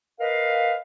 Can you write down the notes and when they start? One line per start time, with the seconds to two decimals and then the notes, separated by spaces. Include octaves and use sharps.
0.20 A#4 B4 D#5 F5